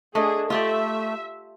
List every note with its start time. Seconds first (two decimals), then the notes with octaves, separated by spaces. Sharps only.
0.15 A3 D4 G#4 D#5
0.50 A3 F4 G4 D5 E5